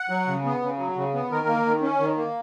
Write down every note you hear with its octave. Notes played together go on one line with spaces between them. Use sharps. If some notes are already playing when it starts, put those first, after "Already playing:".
Already playing: F#5
F#3
C#3
B3
C#3
F#3
C#3
B3
D#3 A#4
A#3
D#3
C#4
D#3
A#3